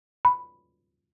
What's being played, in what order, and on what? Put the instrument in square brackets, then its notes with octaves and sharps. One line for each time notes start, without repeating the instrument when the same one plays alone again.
[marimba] B5